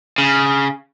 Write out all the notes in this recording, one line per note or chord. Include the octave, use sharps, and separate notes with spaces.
C#3